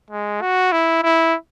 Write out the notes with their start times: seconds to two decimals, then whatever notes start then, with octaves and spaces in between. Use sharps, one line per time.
0.11 G#3
0.41 F#4
0.72 E4
1.03 E4